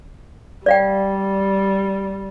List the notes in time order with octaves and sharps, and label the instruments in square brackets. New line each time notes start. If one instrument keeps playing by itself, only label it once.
[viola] G3 [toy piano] D5 F5 G5